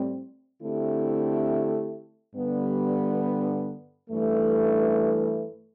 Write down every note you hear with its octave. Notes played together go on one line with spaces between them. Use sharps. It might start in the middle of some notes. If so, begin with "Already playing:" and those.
Already playing: A2 G3 C4
D3 A3 C4 E4 G4
G2 D3 G3 B3
G2 E3 A3